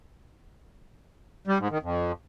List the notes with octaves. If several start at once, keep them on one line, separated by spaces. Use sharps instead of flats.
G3
G#2
D#3
F2